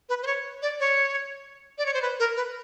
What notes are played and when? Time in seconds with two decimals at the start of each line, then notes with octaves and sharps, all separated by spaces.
0.09 B4
0.23 C5
0.27 C#5
0.62 D5
0.80 C#5
1.78 D5
1.86 C#5
1.94 C5
2.02 B4
2.19 A#4
2.36 B4